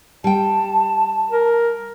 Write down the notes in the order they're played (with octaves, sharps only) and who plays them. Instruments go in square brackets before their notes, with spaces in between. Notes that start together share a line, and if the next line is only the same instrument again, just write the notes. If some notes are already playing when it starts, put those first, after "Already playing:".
[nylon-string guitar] G3 G5 [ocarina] A5
[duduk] A#4